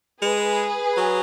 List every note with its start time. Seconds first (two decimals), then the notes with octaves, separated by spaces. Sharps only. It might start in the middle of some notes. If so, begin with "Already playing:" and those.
0.22 G#3 G#4 B4
0.97 F#3